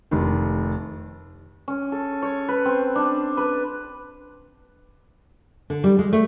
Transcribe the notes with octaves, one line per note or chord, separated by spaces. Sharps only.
F1 D#3
C#4
A4
C#5
B4
C4
D4
B4
D3
G3
G#3
A3